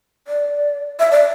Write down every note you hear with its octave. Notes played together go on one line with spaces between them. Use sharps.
D5
E5
D5